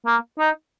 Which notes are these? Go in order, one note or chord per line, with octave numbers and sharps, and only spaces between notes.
A#3
D#4